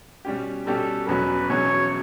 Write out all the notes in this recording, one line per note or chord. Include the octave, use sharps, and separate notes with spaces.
B2 G3 C#4 G4
B2 G3 C#4 G4 A4
E1 E2 B2 F#3 C#4 B4
E1 E2 B2 F#3 C#4 C#5